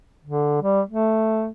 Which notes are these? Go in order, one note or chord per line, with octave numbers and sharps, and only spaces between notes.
D3
G3
A3